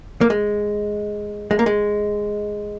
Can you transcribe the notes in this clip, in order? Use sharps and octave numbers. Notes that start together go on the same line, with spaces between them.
A#3
G#3
G#3
A#3
G#3